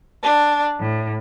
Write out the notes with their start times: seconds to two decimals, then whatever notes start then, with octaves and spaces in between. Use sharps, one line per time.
0.23 D4
0.79 A2